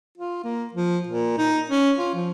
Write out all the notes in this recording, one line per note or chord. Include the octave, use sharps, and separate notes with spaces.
F4
A#3
F3
A#2
D#4
C#4
F4
F3